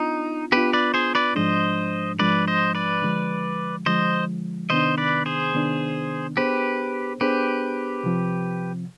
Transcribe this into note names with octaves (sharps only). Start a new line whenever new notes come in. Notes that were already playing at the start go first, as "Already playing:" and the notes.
Already playing: B3 D4 D#4 F4
B3 D4 F4 G4 B4
B4 D5
G#4 C5
B4 D5
G#2 F3 G#3 D4 C5 D#5
G#2 F3 G#3 D4 B4 D5
C5 D#5
B4 D5
D3 F3 G#3
D3 F3 G#3 C5 D#5
C3 D#3 B3 D4 C5 D#5
B4 D5
G#4 C5
C3 D#3 B3 D4
B3 D4 G4 G#4 B4 C5
B3 D4 G4 G#4 B4 C5
C3 F3 C4